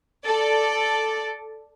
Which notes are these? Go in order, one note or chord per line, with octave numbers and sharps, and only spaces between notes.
A4 D5